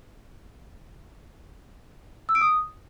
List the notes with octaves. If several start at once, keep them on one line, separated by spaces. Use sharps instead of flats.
E6
D7
D#6